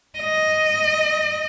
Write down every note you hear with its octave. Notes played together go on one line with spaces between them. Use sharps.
D#5